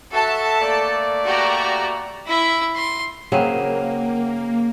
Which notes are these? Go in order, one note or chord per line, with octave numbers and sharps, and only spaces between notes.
F#4 A4 E5 A5
A3 A#3 D5
F#4 G4 A#5
E4 E5
C6
C#3 F#3 A#3 C4 G#4 F#5 G5 D#7